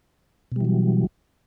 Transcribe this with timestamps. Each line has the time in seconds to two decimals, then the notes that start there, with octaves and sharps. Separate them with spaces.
0.52 B2
0.56 G3
0.61 E3
0.65 F#3